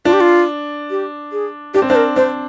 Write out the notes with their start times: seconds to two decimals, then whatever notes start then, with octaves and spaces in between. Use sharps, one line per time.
0.05 D4 F4
0.13 G4
0.21 F4
0.90 G4
1.32 G#4
1.74 D4 G4
1.82 C4
1.89 D4 C5
1.95 A#4
2.16 D4 C5